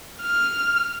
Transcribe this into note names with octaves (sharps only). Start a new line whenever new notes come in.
F6